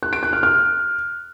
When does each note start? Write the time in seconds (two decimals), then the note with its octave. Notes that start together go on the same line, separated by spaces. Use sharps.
0.03 F#6
0.13 D7
0.23 F#6
0.33 F6
0.43 F6